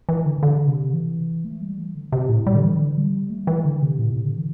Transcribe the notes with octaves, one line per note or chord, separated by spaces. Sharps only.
E3
D3
D3
C3
E3
A3
G3
E3
D3
C3
A2
G3
D3
E3
D3
G3
A3
G3
E3
D3
C3
A2
C3
D3
E3